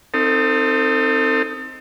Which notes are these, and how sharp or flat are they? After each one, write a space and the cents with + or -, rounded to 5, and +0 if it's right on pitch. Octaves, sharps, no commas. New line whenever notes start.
C4 +0 D#4 +0 A4 +35